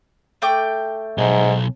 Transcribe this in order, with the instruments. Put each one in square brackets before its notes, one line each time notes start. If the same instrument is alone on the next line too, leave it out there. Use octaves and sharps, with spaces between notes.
[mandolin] A3 G5 D6
[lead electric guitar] B1 [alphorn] G#2